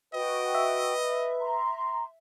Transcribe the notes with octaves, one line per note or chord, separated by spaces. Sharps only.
F#4 B4 D#5 G5
E5
A#5 C6